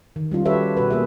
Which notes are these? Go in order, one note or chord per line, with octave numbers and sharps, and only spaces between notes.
D#3
G3 C#4 F4
F#4 G4 A4 B4 C#5 E5
B2 F#4 B4
A#3 G#4 E5